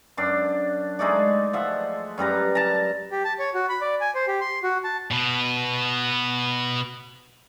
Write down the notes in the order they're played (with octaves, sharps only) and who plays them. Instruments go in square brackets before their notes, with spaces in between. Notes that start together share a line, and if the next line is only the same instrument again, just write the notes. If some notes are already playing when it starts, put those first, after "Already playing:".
[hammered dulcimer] F#2 D4
G#3 A3 D#4 D5
F3 E5 F#5
F#2 G3 B4 A#5
A5 A#5
[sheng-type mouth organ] G4
A5
C#5
F#4
B5
D5
G#5
C5
G4
C6
F#4
A5
[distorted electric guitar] B2 B3